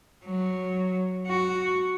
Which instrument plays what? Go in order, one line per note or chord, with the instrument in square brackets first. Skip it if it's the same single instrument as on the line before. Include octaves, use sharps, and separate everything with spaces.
[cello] F#3
F#4